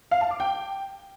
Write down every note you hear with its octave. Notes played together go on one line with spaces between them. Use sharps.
F5
A5
D6
G5